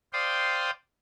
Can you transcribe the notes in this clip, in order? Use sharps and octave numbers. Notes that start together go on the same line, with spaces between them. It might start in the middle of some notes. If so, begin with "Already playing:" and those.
C5 D5 F5 G5 C6 D#6